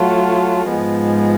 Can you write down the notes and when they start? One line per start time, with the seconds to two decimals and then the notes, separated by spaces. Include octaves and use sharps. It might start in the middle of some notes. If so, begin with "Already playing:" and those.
Already playing: F#3 A3 F4
0.70 G#2 F3 G#3 B3